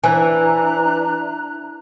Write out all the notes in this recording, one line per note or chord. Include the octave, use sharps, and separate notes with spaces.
E3 D4 C5 G#5 A#5 F#6